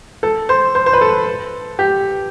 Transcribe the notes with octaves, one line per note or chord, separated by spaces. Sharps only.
A4
C5
C5
C5
B4
A4
G4